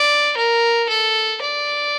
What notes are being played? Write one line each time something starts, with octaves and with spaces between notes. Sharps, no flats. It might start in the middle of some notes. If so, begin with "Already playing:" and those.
Already playing: D5
A#4
A4
D5